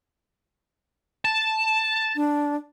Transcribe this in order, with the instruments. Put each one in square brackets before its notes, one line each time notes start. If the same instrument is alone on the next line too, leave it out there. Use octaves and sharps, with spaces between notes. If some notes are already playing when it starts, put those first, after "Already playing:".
[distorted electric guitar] A5
[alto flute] D4